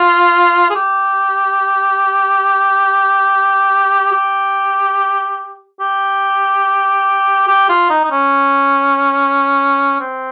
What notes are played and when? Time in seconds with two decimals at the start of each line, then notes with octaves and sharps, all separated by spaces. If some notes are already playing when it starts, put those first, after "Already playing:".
Already playing: F4
0.70 G#4
0.75 G4
4.12 G4
5.80 G4
7.48 G4
7.69 F4
7.90 D#4
8.04 D#4
8.11 C#4
10.00 C4